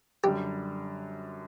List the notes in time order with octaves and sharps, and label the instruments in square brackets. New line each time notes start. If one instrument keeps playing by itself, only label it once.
[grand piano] F#2 D3 G3 [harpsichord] G4